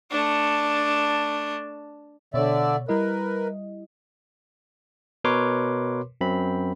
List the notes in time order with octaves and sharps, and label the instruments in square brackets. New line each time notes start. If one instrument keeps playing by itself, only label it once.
[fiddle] A3 D4
[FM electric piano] B2 C#5 [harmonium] D3 D5 E5
[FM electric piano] G3 E4 D#5 [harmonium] A#4 B4
[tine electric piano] B2 A#4 B4 C#5 C6 D6
F#2 C4 B5